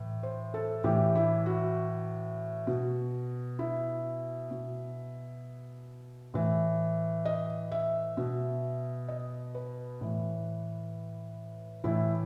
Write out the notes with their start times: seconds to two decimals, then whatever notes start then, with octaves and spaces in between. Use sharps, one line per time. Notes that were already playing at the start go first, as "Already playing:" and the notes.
Already playing: A2 E3
0.23 C5
0.54 A4
0.84 A2 E3 G4
1.15 E4
1.46 F#4
2.67 B2
3.59 E4
4.51 B2
6.34 A2 E3
7.25 D#5
7.72 E5
8.17 B2
9.08 D#5
9.55 B4
10.01 A2 E3
11.84 A2 E3 E4